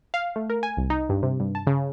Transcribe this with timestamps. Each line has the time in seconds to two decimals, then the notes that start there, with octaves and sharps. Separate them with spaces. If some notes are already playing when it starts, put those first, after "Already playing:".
0.14 F5
0.36 A3
0.50 A#4
0.63 G#5
0.77 C2
0.90 D#4
1.09 G2
1.23 C3
1.40 G2
1.55 A5
1.67 C#3